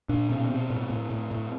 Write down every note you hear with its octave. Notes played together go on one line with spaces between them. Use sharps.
A#2 D4
B2 C#4
B2 C4
A2
A2
A2
A2